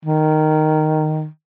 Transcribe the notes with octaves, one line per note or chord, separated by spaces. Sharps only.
D#3